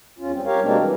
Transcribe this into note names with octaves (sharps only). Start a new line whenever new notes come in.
E2 C#4 F4
G3 C4
G4 A#4 C#5 F5
B2 G3 G#3 A#3 C4 D4
E3